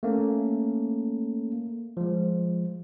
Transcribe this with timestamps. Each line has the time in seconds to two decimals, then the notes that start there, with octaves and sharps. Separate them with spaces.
0.03 A3 A#3 C#4
1.97 F3 G#3